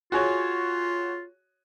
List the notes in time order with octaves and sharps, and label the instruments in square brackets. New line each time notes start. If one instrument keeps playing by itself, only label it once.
[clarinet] F4 [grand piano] F#4 G#4 C#5